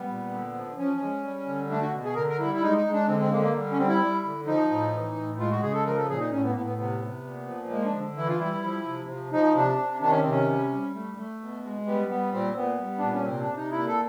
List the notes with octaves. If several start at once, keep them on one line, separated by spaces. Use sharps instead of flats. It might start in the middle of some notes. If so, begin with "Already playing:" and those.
Already playing: G3 B3
A#2
D3
F3
F3 C#4
G#3
G3
D3
A3 D4
F#4
B2
G#4
D3 A#4
A#4
G3 E4
E4
G#3 D#4
D#4
G#3
D4
D3 C4
C4
D3 A#3
A#3
G3
C#4
G3 C4
E4
G3
D3
F3 D#4
A2
E3
A2
G#3 F4
F#4
C#3 G#4
A4
F3 A#4
A4
A#2 G#4
D#4
A2 C#4
B3
A#3
A2 B3
B3
C3 B3
C3
A#2
F3
G#3 A#3
D4
D3
E3 E4
F4
G3 E4
F3
C3
F3
F3 D#4
C3 D4
C3
D#3 D4
C#4
C3 C4
C#4
G3
G3
A3
A3
B2
G#3
G3 B3
G3 B3
A#2 C4
A#2 B3
G3
A#2 D4
C#4
C3 C4
D4
C3
D#4
A#2 E4
A4